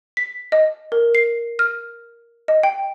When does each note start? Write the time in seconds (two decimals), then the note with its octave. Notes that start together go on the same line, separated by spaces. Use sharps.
0.17 B6
0.52 D#5
0.92 A#4
1.15 C7
1.59 F6
2.48 D#5
2.63 G5